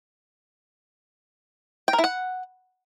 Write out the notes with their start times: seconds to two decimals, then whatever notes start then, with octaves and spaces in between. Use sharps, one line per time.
1.88 G5
1.93 A#4
1.99 E4
2.04 F#5